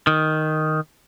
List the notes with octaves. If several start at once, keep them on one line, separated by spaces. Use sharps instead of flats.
D#3